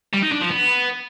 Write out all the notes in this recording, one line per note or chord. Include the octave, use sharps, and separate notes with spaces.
G3
D#4
D4
F3
B3